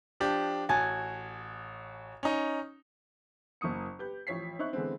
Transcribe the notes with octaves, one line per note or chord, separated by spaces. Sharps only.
F3 D4 G4
A1 F#4 G#5 A5
C#4 D#4
F#1 A#3 C#6 D#6 C#7
G4 B4 G6
A1 F3 C#5 B6 C7
C4 D#4 E4 C#6 F#6
D3 E3 G#3 B3 C4